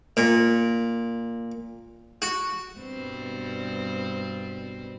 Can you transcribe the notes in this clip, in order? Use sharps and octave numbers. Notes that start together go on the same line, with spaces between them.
A#2
F#4
G2 B2 C4